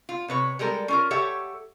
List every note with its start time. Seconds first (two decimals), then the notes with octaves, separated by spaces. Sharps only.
0.09 F4
0.28 C3 B4 C#5
0.59 G3 G#3 A4 A#4
0.88 C#4 F4 A#4
1.11 G4 A4 C#5 E5 F#5